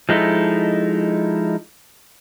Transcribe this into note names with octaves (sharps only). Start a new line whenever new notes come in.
F3 G#3 D#4 E4 A4